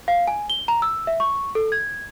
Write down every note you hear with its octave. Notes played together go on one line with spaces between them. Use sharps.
F5
G#5
G7
A#5
E6
E5
C#6
A4
G#6